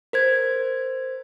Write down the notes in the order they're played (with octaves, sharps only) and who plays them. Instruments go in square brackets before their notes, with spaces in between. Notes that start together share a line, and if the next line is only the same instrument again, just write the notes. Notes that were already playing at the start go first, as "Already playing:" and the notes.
[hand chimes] A#4 C5 G#6